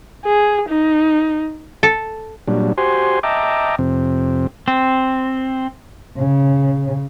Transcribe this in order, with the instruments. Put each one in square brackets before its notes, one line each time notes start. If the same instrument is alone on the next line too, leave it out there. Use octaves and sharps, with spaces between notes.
[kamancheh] G#4
D#4
[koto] A4
[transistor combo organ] A#2 F#3 G3 D4
F#4 G4 C5 G#5 C6
D#5 E5 G5 A5 A#5 D6
F2 C3 C4
[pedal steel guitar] C4
[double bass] C#3